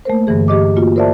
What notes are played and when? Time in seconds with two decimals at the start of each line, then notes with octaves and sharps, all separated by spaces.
0.05 A3 A#3 A#4 C5
0.27 G2 D3 E3 G#4
0.48 G4 D#5 D6
0.76 A#3 F4 F#4
0.96 A#4 C5 D5 E5 A5